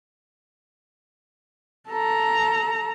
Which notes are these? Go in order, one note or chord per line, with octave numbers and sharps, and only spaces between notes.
A4 A#5